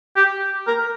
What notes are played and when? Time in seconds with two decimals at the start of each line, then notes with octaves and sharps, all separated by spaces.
0.16 G4
0.67 A#4